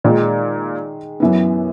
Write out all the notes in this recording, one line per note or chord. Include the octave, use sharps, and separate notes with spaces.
A#2 D#3 G#3 D#4
F#2 E3 B3